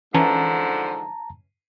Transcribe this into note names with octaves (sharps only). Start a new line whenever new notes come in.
G#2 D3 E3 F3 C#4 A5 A#5